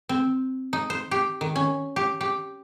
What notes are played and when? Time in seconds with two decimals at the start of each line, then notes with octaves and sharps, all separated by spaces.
0.09 C4
0.73 D#4
0.90 C5
1.11 G4
1.41 D#3
1.56 C#4
1.96 G4
2.21 G4